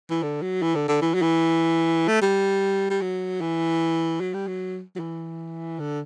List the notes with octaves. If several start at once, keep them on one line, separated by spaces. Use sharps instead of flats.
E3
D3
F#3
E3
D3
D3
E3
F#3
E3
A3
G3
G3
F#3
E3
F#3
G3
F#3
F#3
E3
D3